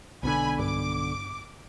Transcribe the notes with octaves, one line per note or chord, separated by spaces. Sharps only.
B1 B2 D3 G#5 B5
G2 D6